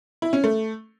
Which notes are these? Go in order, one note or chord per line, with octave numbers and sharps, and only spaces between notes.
E4
C#4
A3